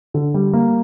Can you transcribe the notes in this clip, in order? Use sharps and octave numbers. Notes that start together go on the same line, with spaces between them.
D3
G3
A#3